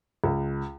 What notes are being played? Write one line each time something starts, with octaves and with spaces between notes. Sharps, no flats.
C#2